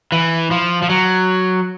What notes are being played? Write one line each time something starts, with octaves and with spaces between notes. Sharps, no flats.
E3
F3
F3
F#3